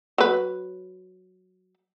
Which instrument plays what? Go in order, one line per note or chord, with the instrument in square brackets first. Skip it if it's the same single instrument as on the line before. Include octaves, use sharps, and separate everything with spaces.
[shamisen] F#3 B4